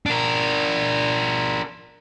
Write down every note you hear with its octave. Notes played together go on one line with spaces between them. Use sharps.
D4 A#4